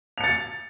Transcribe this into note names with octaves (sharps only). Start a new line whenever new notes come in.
A6 C#7 F7